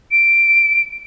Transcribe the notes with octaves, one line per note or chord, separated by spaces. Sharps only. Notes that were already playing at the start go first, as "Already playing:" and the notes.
D7